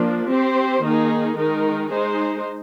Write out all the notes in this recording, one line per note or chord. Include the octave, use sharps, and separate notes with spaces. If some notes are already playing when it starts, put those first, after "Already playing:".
Already playing: F3 A#3 D4
C4 G4 C5
D#3 A#3 D#4 G#4
D#3 G#3 D#4 A#4
G#3 D#4 G#4 C5